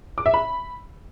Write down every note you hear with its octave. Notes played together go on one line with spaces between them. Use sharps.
D6
E5
B5